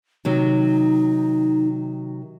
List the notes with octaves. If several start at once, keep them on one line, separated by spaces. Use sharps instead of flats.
C3 D#3 F#3 D#4